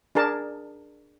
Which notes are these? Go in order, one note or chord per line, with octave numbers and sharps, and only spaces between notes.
D4 G#4 A#4 A5